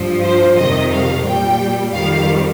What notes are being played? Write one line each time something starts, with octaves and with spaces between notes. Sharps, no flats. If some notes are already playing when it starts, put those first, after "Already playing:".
Already playing: G2 F3
C5
F2 C3 D#3 G3 D#5
F5
A#2 G3 G5
F2 D#3 G3 F5